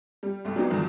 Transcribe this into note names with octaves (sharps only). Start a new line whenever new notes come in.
G3
C2 A3
F#3 B3 C4 D4 D#4
E2 G2 D3 D#3 F3 F#3